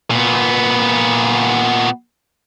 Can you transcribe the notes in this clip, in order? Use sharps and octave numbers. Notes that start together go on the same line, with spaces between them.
A#2 B3